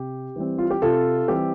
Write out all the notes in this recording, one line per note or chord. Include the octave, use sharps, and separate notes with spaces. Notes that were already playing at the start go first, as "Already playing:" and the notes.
Already playing: C3 G4
E3 G3 C4
F4
G4
C3 F4 A4
E3 G3 C4 G4